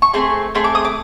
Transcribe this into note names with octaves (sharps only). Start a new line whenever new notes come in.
C#6
A3 C4 G#4 C6
A3 C4 G#4 C6
D6
D#6
D6